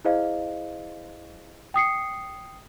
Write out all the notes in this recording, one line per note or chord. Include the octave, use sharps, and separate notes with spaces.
E4 G#4 C5 D#5 F5
G5 D#6 C7 C#7